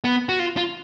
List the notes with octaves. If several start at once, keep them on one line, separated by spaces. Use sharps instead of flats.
B3
F#4
F4
F4